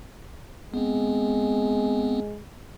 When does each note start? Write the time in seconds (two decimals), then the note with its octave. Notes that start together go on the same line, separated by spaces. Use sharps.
0.74 G#3 B3 C4